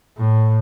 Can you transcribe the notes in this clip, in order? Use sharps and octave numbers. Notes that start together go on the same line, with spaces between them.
A2